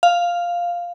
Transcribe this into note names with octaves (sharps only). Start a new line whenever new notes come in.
F5